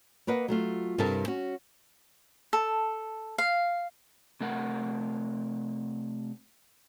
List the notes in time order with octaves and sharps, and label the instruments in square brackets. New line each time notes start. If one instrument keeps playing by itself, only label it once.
[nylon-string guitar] A#3 A#4 B4 D#5 F#5
F#3 A3 F4
G2 C3 E4 A4 A#4 A5
C#4 F#4
[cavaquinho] A4
F5
[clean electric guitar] C3 A3 A#4 F#5